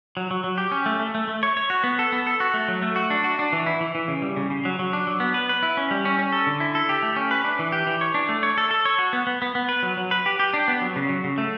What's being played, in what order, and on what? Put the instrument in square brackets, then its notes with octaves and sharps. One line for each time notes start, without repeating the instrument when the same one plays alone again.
[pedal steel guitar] F#3
F#3
F#3
G4
C#4
A3
A3
A3
A3
C#5
C#5
F#4
B3
A4
B3
A4
F#4
A3
F#3
A3
F#4
D4
F#4
D4
E3
E4
E3
E3
C#3
G3
C#3
C#3
F#3
F#3
D4
F#3
B3
B4
B4
E4
C#4
G3
C#4
C#4
A4
D3
E4
A4
G4
A3
C#4
B4
D4
E3
G4
E3
C#5
D4
A3
C#5
A4
A4
C#5
F#4
B3
B3
B3
B3
B4
F#3
F#3
B4
G4
G4
D4
B3
F#3
C#3
F#3
C#3
A3